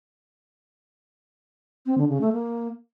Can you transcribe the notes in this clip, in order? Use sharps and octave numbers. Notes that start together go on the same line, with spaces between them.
C4
D3
C#3
A3
A#3